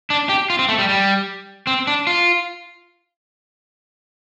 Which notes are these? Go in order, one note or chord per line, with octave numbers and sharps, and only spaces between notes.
D4
G4
F4
C4
A3
G3
G3
C4
D4
F4